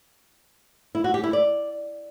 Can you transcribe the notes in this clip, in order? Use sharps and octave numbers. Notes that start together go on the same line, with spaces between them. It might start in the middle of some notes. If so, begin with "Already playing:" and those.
E4
F#4
G4
E4
D5